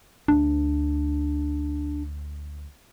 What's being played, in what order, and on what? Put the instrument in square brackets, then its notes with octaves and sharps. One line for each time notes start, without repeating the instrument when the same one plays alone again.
[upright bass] D2 [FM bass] D4